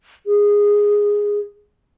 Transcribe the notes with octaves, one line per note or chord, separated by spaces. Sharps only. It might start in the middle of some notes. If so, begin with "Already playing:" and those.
G#4